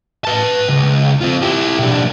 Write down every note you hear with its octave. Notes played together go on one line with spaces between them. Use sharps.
B4 A5
C#2
C4 F4
E4 G4
B1 D4